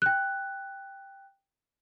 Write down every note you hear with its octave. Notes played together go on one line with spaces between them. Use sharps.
G5 F#6